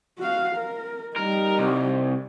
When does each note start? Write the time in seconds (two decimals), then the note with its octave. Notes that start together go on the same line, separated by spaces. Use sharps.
0.19 F#4 F5
0.56 A#4
1.17 G3 D#4 A#4
1.59 C2